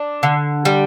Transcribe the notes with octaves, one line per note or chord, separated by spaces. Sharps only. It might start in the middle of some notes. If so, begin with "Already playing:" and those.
Already playing: D4
D3
G3